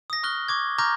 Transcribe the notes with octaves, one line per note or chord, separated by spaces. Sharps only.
D#6 A#6
C#6 F6 F#6 G7
C#6 D6 G#6
A#5 C#6 D6 F6 G6 A#6